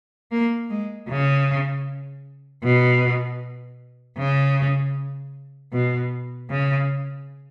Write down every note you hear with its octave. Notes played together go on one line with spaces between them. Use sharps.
A#3
G#3
C#3
B2
C#3
B2
C#3